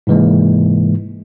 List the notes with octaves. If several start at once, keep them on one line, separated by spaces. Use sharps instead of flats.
G#2 C3 E3 G#3 A#3